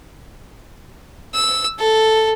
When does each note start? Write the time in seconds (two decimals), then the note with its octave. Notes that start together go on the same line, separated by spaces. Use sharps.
1.34 E6
1.79 A4